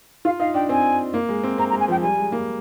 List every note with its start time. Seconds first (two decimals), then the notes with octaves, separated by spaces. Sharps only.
0.25 F4 F5
0.40 D#4 F5
0.54 D4 G5
0.69 C4 G#5
1.14 A#3
1.29 G#3
1.43 C4
1.58 C4 A#5
1.70 A#5
1.73 G#3
1.80 G#5
1.88 F3 G5
2.02 G3 G#5
2.18 G#3
2.32 A#3